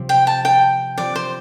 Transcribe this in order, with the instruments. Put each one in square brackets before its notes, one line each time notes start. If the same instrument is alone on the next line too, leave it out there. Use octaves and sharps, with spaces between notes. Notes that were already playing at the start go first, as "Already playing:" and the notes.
Already playing: [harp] C3 F3 C4 G4
[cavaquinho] G5
A5
G5
[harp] F3 C4 G4 [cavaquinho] D5
[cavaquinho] C5